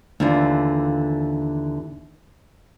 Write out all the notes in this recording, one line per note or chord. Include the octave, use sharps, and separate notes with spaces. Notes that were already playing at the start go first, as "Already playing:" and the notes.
D#2 D3 E3 A3 F4